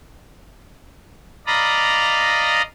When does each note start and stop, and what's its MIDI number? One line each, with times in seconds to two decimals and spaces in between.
1.47 2.62 74
1.47 2.62 75
1.47 2.62 77
1.47 2.62 82
1.47 2.62 83